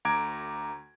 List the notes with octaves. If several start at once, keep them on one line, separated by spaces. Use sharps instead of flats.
D2 A#5 D6 G#6 D7